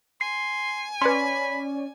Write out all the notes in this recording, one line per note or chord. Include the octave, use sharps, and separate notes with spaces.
G#5 C6 C7
C#4 B4 C#5 D5 B5 C6